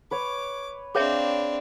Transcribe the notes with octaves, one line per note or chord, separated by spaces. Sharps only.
B4 C#5 D6
C4 D4 G#4 C#5 E5 F5